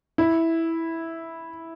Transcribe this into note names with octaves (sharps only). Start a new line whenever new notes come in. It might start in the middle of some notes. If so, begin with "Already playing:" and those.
E4